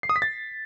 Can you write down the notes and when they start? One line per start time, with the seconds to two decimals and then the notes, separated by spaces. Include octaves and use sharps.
0.03 C7
0.09 D#6
0.16 B6
0.22 A6